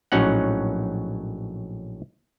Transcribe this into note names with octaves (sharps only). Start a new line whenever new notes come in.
A#1 A2 F#3 C#4 D#4 F#5